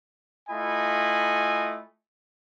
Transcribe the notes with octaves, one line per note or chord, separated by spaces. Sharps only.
A3 E4 F4 D#5 G#5 B5